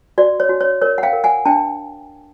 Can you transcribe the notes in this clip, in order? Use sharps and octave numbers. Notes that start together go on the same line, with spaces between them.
F#4 D5
C#5
F#4
C#5
A#4 C#5
F#5
F5 G5
A#4
F#5 G#5
D4 G5 A5